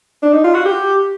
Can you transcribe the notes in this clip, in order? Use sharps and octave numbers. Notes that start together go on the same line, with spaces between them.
D4
D#4
F4
F#4
G4